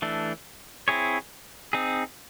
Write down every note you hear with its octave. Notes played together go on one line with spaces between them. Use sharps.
E3 A3 D4
C4 E4 G#4 C#5
C4 D#4 G#4